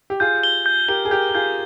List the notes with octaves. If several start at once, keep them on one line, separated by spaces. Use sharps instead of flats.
G4
F4 G#4 G6
G7
G6
G4 A#4 G7
G#4
G4 A#4 G6
A#4
F4 G#4 G6